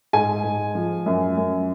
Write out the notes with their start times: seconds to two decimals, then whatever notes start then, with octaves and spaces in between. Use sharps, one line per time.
0.13 G#2 G#5
0.44 G#2
0.75 F3
1.06 F#2
1.37 F#2